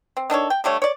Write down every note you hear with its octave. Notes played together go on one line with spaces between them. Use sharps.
C4
D#3 D4 A4 C#5
G5
D3 G3 A3 C#5
C#5 D5